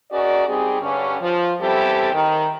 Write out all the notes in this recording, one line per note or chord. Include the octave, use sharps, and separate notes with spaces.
C#4 F#4 G#4 A#4 D5 D#5
G3 C4 D#4 G4 G#4
G2 D3 C#4
F3
E2 G3 C4 E4 G4 A4
D#3